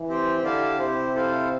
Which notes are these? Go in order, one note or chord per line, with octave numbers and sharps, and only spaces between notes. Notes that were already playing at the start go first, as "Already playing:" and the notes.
Already playing: E3
C4 G4 C5 G5
D3 E4 G4 D5 F5 A5
C3 E4 G4 C5
E4 A4 C5 F5